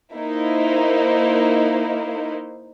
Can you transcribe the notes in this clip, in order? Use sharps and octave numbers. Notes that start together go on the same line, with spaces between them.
A#3 D#4 E4 C5